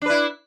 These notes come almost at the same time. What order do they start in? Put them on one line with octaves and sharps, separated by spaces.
D4 B4 E4